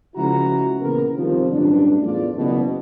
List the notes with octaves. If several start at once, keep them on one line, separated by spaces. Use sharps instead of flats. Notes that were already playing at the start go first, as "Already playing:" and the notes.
C#2 C#3 F3 E4 F#4 A#5
A#2 C#3 E3 B3 A#4
C2 C3 D#3 F3
A1 G2 F#3 D4
E2 A2 B3 F4 D5
F#1 B2